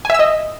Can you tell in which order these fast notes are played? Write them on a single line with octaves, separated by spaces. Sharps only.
G#5 E5 E6 D#5